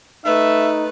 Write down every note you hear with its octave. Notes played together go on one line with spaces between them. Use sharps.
A3 D#4 B4 E5